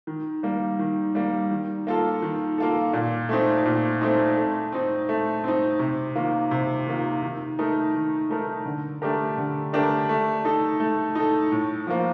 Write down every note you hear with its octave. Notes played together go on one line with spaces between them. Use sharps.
D#3
G3 A#3
D#3
G3 A#3
D#3
A#3 F4 A4
D#3
A#3 F4 A4
A#2
A3 C4 D#4
A#2
A3 C4 D#4
A3
C4 D#4
A3
C4 D#4
C3
D#3 A#3 F4
C3
D#3 A#3 F4
D#3
A3 D#4 A#4
D#3
A3 D#4 A#4
D3
A3 D4 G4 A#4
D3
A3 D4 G4 A#4
A3
D#4 A4
A3
D#4 A4
A2
F3 A#3